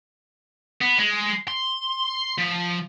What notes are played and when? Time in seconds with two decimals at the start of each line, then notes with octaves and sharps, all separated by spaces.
0.81 B3
0.99 G#3
1.48 C6
2.38 F3